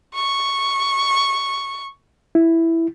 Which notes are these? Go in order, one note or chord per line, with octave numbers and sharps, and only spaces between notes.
C#6
E4